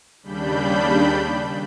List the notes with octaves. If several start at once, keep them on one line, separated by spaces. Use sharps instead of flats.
D#2 C#3 G3 D4 B5 G6